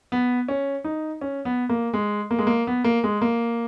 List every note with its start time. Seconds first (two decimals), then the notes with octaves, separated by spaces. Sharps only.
0.12 B3
0.48 C#4
0.84 D#4
1.21 C#4
1.45 B3
1.69 A#3
1.93 G#3
2.31 A#3
2.39 G#3
2.47 A#3
2.67 B3
2.84 A#3
3.04 G#3
3.22 A#3